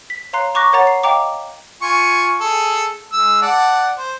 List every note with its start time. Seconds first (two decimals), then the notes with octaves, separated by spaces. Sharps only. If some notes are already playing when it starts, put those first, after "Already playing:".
0.10 B6
0.33 C#5 F5 A#5 C6 F#6 C7
0.55 A#5 C#6 D6 F#6 A#6
0.73 A#4 C#5 F#5 A#5 A6
0.87 C7
1.03 D#5 F5 G5 A#5 D6
1.82 F4 G#5 C#6
2.40 G#4 A4
3.13 G#3 E6
3.42 D5 F#5 A5
3.98 C5